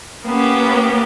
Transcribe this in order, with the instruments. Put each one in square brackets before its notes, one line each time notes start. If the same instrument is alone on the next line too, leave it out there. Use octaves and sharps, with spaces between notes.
[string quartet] A#3 B3 C#4 G4